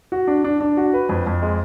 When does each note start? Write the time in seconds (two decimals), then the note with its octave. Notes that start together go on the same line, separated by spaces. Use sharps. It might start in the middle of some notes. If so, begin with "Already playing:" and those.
0.12 F#4
0.28 D4
0.44 D4
0.60 D4
0.77 F#4
0.94 B4
1.09 F2
1.27 F2
1.42 G#3